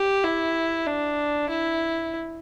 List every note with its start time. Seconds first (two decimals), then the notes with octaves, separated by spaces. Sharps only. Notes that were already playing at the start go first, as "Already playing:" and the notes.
Already playing: G4
0.24 E4
0.87 D4
1.50 E4